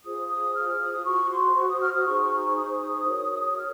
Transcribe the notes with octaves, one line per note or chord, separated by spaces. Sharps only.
F4 G#4 C5 D#6
D#6
F6
D#6
F#4 C5 C#6
C6
C#6
D#6
F6
D#6
D#4 G#4 C5 C#6
C#6
C#6
D#6
F#4 A#4 C#5
F6